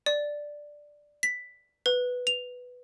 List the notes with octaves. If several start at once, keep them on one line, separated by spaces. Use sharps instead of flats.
D5
B6
B4
F7